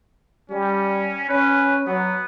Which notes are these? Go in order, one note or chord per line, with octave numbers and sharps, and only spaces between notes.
G3 C#4
C#4 B4
F#3 B3